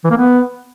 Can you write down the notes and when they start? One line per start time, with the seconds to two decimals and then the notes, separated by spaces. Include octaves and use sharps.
0.04 E3
0.10 A#3
0.17 B3